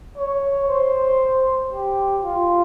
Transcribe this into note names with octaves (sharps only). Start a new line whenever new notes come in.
C#5
C5
G4
F4